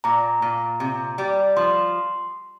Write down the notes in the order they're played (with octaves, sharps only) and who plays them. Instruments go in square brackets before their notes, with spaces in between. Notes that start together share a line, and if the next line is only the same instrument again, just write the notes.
[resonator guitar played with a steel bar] A#2 [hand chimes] A#5
[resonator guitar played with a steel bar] A#2
C3
G3
[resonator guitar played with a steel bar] F3 [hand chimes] C6